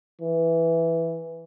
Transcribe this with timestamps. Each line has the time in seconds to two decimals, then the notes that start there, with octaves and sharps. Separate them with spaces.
0.22 E3